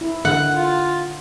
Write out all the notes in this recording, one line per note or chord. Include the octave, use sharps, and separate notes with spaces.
E4
D3 F#5
F4